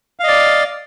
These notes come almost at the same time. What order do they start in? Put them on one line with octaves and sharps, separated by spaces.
F5 D#5 D5